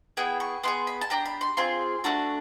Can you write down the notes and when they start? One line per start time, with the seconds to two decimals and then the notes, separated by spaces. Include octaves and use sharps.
0.17 B3 E4 G#4 G5
0.40 C#6
0.63 B3 E4 C6
0.68 G#4
0.87 B5
1.01 A5
1.10 D4 G4 A#5
1.25 B5
1.41 C6
1.57 C4 F4 G#4 C6
2.04 A3 D4 F#4